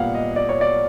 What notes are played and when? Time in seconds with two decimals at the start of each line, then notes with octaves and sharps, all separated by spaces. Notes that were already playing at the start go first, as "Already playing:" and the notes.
Already playing: A#2 G3 B3 F5 F#5
0.15 D#5
0.36 D5
0.49 C#5
0.61 D5